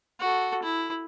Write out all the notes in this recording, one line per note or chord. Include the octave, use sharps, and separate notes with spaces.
F#4 A4
E4